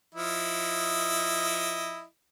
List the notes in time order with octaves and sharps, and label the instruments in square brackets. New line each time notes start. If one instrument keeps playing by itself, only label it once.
[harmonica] F3 E4 D#5